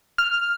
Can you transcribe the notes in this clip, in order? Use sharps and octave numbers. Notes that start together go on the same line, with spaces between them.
F6